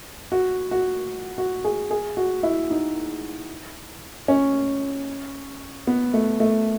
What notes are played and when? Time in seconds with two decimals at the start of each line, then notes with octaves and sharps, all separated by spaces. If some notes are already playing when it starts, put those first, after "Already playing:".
0.32 F#4
0.71 F#4
1.38 F#4
1.64 G#4
1.91 G#4
2.17 F#4
2.43 E4
2.71 D#4
4.28 C#4
5.87 B3
6.14 A3
6.40 A3